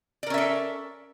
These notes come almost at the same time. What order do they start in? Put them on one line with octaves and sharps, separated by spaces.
D5 A#4 C#4 E5 A4